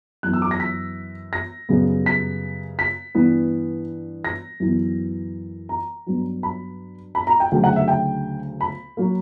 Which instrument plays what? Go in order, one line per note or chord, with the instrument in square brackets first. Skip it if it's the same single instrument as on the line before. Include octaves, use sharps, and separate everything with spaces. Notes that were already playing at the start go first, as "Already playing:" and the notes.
[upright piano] F#2 E3 B3 F#6
E6
D6
A#6
B6
A#6
F#2 C#3 G3 B3
B6
B6
G2 E3 B3
A#6
F#2 E3 B3
A#5
G2 F#3 B3
B5
B5
A#5
G5
D2 C#3 F#3 G5
F#5
E5
G5
B5
F#3 A#3